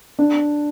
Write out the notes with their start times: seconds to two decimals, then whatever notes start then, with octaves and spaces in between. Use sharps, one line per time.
0.19 D4